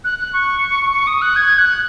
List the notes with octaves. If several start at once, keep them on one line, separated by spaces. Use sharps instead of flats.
F#6
F#6
C#6
C#6
D#6
F#6
G#6
F#6